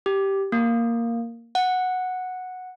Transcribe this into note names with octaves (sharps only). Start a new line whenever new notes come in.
G4
A#3
F#5